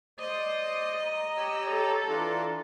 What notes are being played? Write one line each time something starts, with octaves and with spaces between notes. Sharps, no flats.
C5 D5 D#5 D#6
A#5
G4 C#5 E6
A4
E3 D4 F4